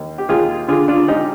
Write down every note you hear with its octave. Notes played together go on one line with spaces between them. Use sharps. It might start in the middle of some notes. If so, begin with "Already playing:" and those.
Already playing: D#2
G4
D#2 F4 G#4
D3 F4 G#4
D4 F4
G#1 D#4 G4